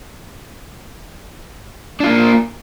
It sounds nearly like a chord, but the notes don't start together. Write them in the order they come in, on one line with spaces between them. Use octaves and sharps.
D4 F4 A#3